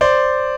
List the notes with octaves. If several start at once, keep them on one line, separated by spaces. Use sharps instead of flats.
C5 D5